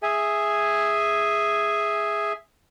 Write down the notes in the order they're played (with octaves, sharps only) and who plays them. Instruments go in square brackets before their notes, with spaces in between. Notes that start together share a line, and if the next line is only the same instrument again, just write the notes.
[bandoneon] G#4 E5 G#5